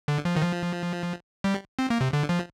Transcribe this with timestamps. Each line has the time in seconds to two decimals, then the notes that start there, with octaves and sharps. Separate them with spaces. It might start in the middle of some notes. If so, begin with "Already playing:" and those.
0.08 D3
0.25 F3
0.36 D#3
0.42 F3
1.44 G3
1.79 C4
1.90 A#3
2.01 C3
2.13 D3
2.29 F3